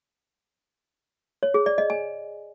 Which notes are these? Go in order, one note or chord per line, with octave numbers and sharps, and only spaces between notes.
C#5
G#4
D5
D#5
G#5